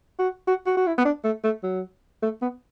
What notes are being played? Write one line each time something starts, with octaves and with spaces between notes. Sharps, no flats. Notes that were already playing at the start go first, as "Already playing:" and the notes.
F#4
F#4
F#4
F#4
E4
B3
D4
A3
A3
F#3
A3
B3